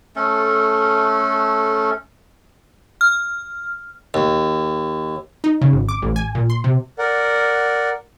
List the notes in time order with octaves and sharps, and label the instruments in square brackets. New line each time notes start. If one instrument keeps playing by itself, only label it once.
[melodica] A3 C#4 A4
[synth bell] F6
[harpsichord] D#2
[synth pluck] D#4
C#3
G#1
D6
A1
G#5
A#2
C6
C3
[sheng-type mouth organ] A#4 D5 F#5